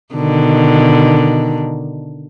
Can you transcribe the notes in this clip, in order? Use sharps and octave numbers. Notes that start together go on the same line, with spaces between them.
B2 D3 D#3